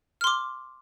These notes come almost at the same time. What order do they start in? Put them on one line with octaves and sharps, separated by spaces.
F6 C6 D6